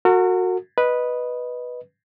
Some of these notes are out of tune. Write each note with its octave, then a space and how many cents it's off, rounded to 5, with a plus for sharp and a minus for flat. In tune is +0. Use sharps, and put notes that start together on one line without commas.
F#4 -15 A#4 -45
B4 -5 D#5 +0